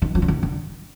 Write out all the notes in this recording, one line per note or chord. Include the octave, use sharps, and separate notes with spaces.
D#3
F3
D3
D#3
D3